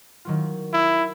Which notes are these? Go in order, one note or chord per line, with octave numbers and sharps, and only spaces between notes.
D#3 F#3 F4
E4